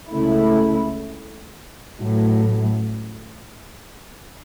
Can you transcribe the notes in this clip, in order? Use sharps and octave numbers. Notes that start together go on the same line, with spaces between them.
C#2 C#3 A3 E4
A1 A2 F#3